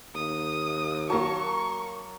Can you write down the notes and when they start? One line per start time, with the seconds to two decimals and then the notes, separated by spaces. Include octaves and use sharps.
0.15 D#2 D#6
1.10 F#3 A#3 A5 C#6